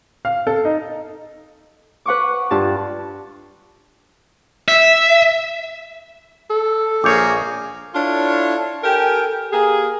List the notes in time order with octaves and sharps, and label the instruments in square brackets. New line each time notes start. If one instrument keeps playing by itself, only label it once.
[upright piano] F5
A4
D#4
[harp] B4 F#5 C#6 D6
G2 F4 A5
[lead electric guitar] E5
[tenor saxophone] A4
[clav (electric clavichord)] A#1 C#5 [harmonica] A#3 G#4 [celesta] D6 G6
[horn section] D4 E4 F4 A4 C#5
G4 A4 A#4 G5 G#5
A#3 G4 G#4